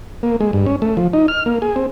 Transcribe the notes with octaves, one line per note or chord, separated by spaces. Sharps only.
A#3
G#3
G2
C#4
A3
F3
D#4
F6
A#3
G#4
C4